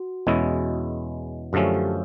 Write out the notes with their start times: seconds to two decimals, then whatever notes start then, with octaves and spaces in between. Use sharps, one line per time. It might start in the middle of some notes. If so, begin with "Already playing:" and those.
Already playing: F#4
0.27 E2 B2 G#3 C#4 E4
1.53 F#2 D3 F3 A3 C#4 G4
1.74 C#5